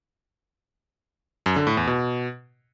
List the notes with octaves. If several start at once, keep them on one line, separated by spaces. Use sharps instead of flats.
F#2
D3
A2
E2
B2